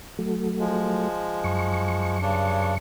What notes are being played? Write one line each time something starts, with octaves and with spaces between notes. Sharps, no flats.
F#3 A3
F3 G#3
F#2 C#6
G2 C#3 D4